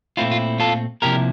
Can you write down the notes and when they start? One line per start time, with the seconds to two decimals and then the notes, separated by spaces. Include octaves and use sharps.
0.17 A#2 A3 C4 E4 F4
0.31 F4
0.60 F4 A4
1.02 C3 F3 A#3 E4 G4 A#4